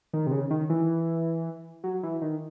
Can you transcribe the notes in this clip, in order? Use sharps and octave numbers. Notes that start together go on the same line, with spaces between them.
D#3
C3
C#3
D#3
E3
F#3
E3
D#3